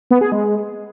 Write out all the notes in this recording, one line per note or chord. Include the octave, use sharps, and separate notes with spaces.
B3
G#4
G#3